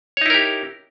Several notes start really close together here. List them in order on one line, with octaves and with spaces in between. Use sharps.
C#5 D#4 E4 A#4 G4